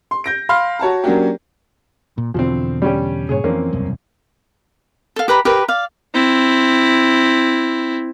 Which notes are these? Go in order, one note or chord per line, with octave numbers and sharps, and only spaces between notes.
C6
G6 A#6 D7
F5 B5 C6 F6
F#4 C#5 A5 A#5
F#3 A#3 C#4 D4 F#4 G4
A#2
E2 B2 D3 F3 C4
G3 C#4 G4
G2 A#2 C#3 G#4 C#5
F2 E3 A#3 C4 C#4
E1 C2 F#2
A4 F5
G4 B4 A#5 B5
G4 A#4 B4 A#5
D5 F5
C4 E4